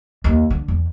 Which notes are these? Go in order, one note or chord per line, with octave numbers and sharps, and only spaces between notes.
D#2
D3
E2